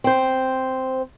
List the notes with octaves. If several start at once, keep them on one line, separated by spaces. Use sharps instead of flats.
C4 C5